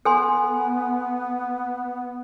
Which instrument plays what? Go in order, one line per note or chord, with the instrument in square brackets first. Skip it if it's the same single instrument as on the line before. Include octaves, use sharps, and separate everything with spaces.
[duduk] B3 [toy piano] A4 G#5 C6